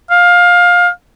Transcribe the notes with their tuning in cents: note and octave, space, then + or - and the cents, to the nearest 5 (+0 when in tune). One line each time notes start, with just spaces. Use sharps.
F5 +20